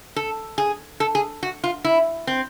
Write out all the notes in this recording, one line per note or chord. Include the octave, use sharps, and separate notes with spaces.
A4
G#4
A4
G#4
F#4
F4
E4
C4